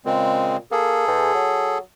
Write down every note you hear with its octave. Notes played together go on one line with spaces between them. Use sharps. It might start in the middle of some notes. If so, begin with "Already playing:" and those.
A#2 C#3 G#3 C4
A#3 G#4 A4
E2
F#3